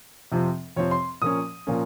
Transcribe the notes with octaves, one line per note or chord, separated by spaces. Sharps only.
F2 C3 F3 C4
F2 C3 F3 C4 C#5
C6
A#2 F3 A#3 C#4 D#6
A#2 F3 A#3 C#4